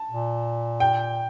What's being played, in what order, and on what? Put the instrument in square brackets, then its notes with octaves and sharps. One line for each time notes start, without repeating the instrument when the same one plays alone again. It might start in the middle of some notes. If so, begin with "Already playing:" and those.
Already playing: [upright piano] A5
[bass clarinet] A#2
[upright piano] G5